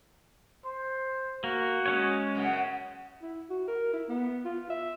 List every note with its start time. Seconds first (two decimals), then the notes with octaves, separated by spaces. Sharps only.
0.65 C5
1.44 A#3 F#4
1.86 G#3 C#4 C#5
2.35 F#2 C#3 B3
3.22 E4
3.50 F#4
3.68 A#4
3.93 E4
4.09 B3
4.45 F4
4.70 E5